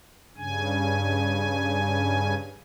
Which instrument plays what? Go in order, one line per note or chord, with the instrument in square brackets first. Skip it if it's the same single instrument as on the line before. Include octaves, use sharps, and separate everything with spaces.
[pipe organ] G2 C#3 G#5